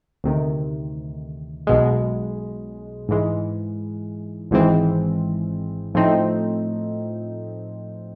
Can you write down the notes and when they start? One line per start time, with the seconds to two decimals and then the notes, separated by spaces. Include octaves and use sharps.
0.24 D2 C3 D#3
1.67 B1 B2 G#3
3.09 G#2 E3 G#3
4.51 G#1 G#2 E3 G#3 C4
5.94 A2 F3 A3 C4 D#4